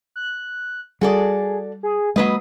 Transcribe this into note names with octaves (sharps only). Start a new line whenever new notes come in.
F#6
G3 F#4 G#4 A4 D5
G#4
F#3 G#3 A#3 B4 D#5 D#6